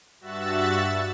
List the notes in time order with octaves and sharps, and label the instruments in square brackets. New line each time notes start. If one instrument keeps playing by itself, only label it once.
[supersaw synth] G2 F#4 E5 E6 F#6 A6